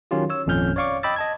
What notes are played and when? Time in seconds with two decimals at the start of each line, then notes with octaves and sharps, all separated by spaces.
0.11 D#3 F#3 C#4 F4 G4
0.30 C#5 E6
0.47 G#1 F2 A#2 C#4 F6 G6
0.76 C#5 D5 F5 C#6 D6
1.03 D#5 G5 B5 D6 E6 A6
1.16 D#5 A5 G#6